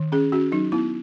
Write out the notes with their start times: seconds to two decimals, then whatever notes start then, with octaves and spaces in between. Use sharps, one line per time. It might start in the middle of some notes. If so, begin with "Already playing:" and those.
Already playing: D#3
0.12 C#4 G#4
0.32 C#4 F#4
0.52 F#3 D#4
0.72 B3 E4